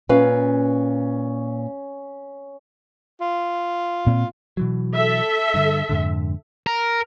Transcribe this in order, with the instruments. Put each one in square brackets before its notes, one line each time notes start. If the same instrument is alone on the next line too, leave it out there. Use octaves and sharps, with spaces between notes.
[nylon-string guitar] A#2 B4 F5 [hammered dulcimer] C#4
[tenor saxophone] F4
[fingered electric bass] A#2 C4
[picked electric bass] B2 E3 F#3
[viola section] A4 E5
[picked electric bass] G2 D3
F2 G#2 D3
[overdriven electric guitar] A#4